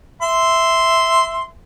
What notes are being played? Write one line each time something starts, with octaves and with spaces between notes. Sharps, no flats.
E5 C6